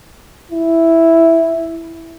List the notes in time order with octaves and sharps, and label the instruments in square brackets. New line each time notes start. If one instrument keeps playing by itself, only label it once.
[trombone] E4